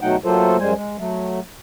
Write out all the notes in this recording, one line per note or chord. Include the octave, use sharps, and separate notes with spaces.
B2 F#3 A3 D#4 F#5 G5
F#3 A3 A#3 F4 A4 C5
F#2 G3 G#3 C5 G#5
G#3
F#3 A3